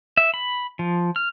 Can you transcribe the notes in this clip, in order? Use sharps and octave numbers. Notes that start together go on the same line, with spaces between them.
E5
B5
F3
F6